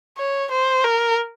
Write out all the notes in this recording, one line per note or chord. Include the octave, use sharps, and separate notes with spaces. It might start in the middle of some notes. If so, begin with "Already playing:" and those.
C#5
C5
A#4